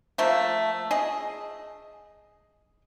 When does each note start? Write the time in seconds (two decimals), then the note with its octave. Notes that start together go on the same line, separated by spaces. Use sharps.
0.18 F3 A3 A#3
0.91 G#4 D#5